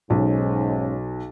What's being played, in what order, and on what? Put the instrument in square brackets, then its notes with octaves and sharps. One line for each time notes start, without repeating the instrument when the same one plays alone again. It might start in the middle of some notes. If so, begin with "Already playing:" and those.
[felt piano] B1 [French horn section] G#2 C#4